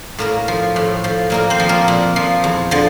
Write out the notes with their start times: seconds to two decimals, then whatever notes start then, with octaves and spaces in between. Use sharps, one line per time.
0.18 A2 A#3 A#4
0.48 F3
0.76 A2
1.04 F3
1.30 A#2 A#3 A#4
1.50 C4 C5
1.60 F3
1.69 A#3 A#4
1.88 A#2
2.16 F3
2.44 E2
2.71 D3 F3